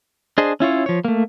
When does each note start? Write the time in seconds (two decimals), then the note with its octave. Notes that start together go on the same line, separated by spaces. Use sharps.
0.38 D4 G#4 C5 D#5
0.60 C#4 E4 F4 C#5
0.86 F3 C#5
1.05 A3 A#3